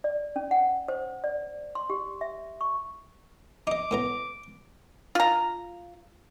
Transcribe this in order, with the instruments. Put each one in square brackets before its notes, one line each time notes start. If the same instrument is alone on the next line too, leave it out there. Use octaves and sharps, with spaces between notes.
[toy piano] D5
C#4
F#5
C5
D5
C6
G4
E5
C#6
[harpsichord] D#4 D#5 [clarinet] D6
[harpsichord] A2 B3 A#5
[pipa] F4 A#5